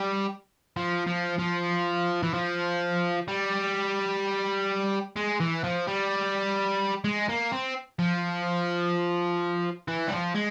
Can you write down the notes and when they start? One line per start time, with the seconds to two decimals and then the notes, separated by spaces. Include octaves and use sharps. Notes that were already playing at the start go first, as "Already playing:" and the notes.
Already playing: G3
0.77 F3
1.07 F3
1.39 F3
2.23 E3
2.33 F3
3.28 G3
5.16 G#3
5.40 E3
5.64 F3
5.87 G3
7.04 G#3
7.29 A#3
7.52 C4
7.99 F3
9.88 E3
10.07 G3
10.11 F3
10.35 G#3